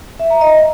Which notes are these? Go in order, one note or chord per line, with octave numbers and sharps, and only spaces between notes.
E5
A#5
D#5